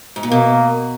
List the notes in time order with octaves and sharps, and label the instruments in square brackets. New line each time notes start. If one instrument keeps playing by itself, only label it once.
[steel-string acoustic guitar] G#2
A#2
[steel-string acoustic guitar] B2 [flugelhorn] A#3